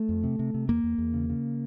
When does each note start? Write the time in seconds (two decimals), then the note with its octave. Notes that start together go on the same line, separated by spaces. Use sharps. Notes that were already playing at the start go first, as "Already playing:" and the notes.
Already playing: A3
0.09 F2
0.24 C3
0.39 C3
0.54 C3
0.68 E2 A#3
0.84 E2
0.98 E2
1.14 C#3
1.29 C#3